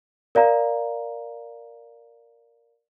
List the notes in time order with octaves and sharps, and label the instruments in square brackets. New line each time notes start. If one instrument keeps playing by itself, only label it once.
[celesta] A#4 D5 F5 A#5